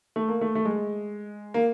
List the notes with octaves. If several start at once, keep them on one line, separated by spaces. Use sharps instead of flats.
A3
A#3
A3
A3
G#3
A#3